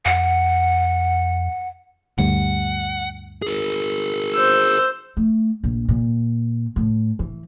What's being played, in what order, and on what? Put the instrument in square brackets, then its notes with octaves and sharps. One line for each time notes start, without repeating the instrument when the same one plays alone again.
[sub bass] F2 [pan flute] F#5
[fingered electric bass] D2 G2 [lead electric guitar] F#5
[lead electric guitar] G#4 A#4
[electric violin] C5 E6
[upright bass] A3
A#1
A#2
A2
E3